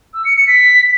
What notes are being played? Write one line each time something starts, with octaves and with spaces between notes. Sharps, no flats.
E6
C#7
C#7
B6